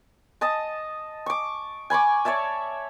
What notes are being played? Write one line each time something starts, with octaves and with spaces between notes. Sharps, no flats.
D#5 A5 D#6
C#6 D6
G#5 B5 C#6 D6
C#5 D5 E5 A5